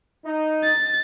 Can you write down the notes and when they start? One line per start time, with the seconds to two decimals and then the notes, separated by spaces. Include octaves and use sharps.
0.24 D#4
0.64 A6